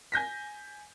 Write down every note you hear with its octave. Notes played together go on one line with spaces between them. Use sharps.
G#5 G6 A#6 B6